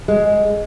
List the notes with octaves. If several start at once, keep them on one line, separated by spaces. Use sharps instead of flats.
G#3